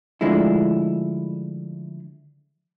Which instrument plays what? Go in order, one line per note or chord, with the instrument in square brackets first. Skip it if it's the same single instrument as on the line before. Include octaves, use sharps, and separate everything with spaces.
[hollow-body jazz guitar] D3 F3 G#3 A3 E4